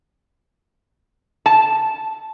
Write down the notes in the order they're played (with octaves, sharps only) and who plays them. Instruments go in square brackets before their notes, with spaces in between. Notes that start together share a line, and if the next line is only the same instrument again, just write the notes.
[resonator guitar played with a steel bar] A5